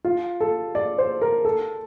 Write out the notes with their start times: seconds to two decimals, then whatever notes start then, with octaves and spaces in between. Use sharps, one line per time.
0.05 F4
0.40 A4
0.75 D5
0.98 C5
1.22 A#4
1.45 A4